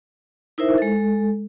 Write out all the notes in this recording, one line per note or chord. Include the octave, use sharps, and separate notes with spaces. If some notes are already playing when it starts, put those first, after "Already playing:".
D#4 E4 A#4 C5 E5
G#3 A4